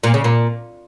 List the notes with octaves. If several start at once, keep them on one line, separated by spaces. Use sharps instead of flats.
A#2
C#3
A#2